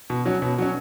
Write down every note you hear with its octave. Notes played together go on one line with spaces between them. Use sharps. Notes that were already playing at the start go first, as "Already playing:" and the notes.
B2
F#3 C#4
B2
F#3 C#4